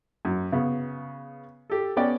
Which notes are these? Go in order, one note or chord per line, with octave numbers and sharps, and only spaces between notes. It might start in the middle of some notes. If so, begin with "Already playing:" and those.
F#2
C#3 B3
G4 A4
B3 C#4 D5 G5